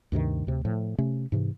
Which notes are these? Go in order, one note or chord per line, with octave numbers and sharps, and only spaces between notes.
D2 G2 C3 D#3
D2 C3
A2 F3
C3 A3 C#4
G#2 C3 E3